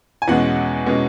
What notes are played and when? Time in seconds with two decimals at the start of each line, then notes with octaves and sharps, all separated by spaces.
0.22 G#5
0.28 E2 B2 G#3 C#4 F#5
0.87 B2 G#3 C#4